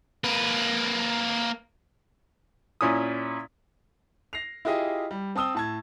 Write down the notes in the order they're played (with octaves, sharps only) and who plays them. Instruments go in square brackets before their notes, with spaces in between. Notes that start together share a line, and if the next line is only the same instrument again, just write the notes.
[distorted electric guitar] A#3 B4
[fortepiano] A#2 C#4 E4 D#6
[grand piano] A#6 C7 F7
E4 F4 G4 G#4 D#5 E5
G3
C4 A5 D#6 E6 G7
A2 A5 G#6